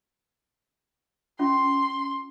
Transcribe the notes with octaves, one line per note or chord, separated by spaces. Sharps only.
C#4 F4 E5 C6